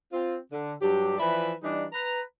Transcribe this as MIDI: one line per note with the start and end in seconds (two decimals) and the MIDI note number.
0.12 0.37 60
0.12 0.37 65
0.51 0.73 50
0.81 1.17 43
0.81 1.17 54
0.81 1.17 62
0.81 1.17 67
1.18 1.53 52
1.18 1.53 53
1.18 1.53 71
1.18 1.53 74
1.18 1.53 76
1.18 1.53 83
1.62 1.85 52
1.62 1.85 55
1.62 1.85 62
1.62 1.85 63
1.93 2.21 71
1.93 2.21 82